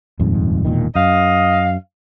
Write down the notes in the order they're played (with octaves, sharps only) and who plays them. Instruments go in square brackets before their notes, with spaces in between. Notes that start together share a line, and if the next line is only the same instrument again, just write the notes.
[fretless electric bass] D#1 F2 G#2
E1 A#2 D#3
[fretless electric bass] F#2 [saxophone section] D#5 F5